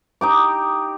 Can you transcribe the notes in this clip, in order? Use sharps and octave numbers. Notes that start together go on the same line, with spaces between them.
D#4 G4 D6